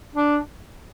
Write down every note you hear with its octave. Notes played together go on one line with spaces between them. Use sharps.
D4